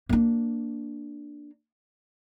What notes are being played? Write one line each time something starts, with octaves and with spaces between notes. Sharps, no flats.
A#3 D4